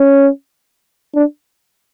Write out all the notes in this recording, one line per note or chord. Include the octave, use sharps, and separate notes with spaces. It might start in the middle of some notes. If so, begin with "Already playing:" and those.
Already playing: C#4
D4